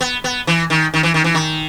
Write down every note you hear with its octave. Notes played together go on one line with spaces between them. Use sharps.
B3
B3
E3
D#3
D#3
E3
D#3
E3
D#3